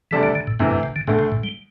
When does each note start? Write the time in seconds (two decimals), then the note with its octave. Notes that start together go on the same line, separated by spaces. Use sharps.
0.11 D2 C3 E3 G3 D4 A4
0.23 D3
0.35 D3
0.47 A2
0.59 D2 G2 C3 E3
0.71 G2
0.83 C3
0.96 D3
1.07 D2 A2 D3 A3
1.19 C3
1.32 A2
1.43 G3